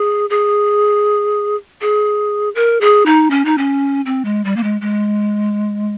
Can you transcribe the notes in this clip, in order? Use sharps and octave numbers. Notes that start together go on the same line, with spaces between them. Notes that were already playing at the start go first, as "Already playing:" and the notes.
Already playing: G#4
G#4
G#4
A#4
G#4
D#4
C#4
D#4
C#4
C4
G#3
G3
A#3
G#3
G#3